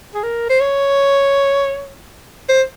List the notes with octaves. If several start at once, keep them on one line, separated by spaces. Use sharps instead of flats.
G#4
A#4
C5
C#5
C5